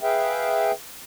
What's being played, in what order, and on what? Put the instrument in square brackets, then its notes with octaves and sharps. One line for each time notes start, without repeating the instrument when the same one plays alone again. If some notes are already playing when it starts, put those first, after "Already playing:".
[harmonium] G#4 B4 E5 F5 G5